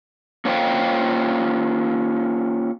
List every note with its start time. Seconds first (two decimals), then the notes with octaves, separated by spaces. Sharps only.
0.45 A#3 C#4 F4 C5 F5 G5